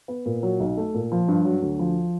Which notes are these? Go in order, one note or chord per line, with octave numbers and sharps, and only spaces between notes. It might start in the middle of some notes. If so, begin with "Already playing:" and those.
B3
A#2
F#3
B1
A3
A#2
F3
G2
F#3
D2
F3